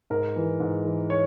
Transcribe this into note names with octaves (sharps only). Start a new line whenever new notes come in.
G#2 A#4
E3
G#2
E3
C#5